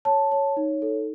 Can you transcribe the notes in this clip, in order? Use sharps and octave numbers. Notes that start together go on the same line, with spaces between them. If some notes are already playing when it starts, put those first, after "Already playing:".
C#5 A5
C#5
D#4
A4